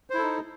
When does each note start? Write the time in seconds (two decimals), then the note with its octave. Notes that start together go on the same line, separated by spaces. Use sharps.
0.10 C5
0.14 E4
0.18 A4
0.23 D#4